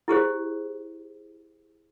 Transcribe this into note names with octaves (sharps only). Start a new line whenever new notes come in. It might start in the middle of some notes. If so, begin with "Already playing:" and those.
E4 G4 G#4 C5